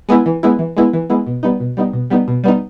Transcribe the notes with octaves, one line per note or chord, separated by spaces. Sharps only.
G#3 B3 E4
E3
G#3 B3 E4
E3
G#3 B3 E4
E3
G#3 B3 E4
B2
G3 B3 D#4
B2
G3 B3 D#4
B2
G3 B3 D#4
B2
G3 B3 D#4